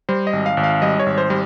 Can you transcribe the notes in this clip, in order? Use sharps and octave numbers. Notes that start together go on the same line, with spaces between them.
G3 C5
D#5
G#1
F5
G#1
F5
G3 D#5
C#5
G#1
C5
G3